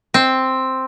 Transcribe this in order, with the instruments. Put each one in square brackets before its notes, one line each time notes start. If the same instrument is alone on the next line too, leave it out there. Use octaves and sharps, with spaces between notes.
[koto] C4